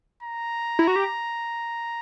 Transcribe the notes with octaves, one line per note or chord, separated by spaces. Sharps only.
A#5
E4
F#4
G4